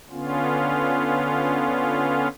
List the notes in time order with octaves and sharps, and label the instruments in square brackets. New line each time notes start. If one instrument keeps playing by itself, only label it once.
[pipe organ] D3 B3 C#4 F4